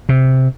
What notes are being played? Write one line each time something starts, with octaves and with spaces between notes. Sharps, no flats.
C3